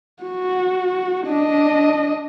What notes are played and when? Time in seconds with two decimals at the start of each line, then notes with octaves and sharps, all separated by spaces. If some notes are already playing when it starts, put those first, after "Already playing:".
0.23 F#4
1.27 D4 D#5